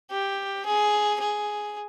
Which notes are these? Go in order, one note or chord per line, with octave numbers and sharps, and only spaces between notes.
G4
G#4
G#4